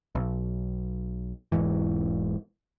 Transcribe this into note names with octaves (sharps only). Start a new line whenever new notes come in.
B1
E1 E2 G#2 E3